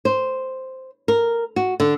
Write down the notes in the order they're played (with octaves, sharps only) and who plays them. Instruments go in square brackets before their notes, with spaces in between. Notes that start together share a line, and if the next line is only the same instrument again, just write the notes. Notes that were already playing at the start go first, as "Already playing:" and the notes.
[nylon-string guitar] C5
A#4
F#4
D3